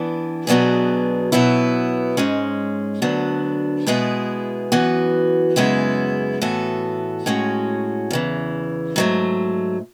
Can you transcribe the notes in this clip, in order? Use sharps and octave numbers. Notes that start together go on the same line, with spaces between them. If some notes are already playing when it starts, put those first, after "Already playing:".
Already playing: E3 B3 D4
B2 F#3 B3 D4 G#4
B2 F#3 B3 E4
G#2 G#3 C#4
D2 D3 F#3 B3 D4
B2 G#3 B3 E4 G#4
F#2 E3 B3 F#4
F#2 C#3 G#3 B3 E4
A2 E3 B3 F#4 A4
A2 G#3 C#4 F#4
E2 C#3 E3
G#2 F#3 A3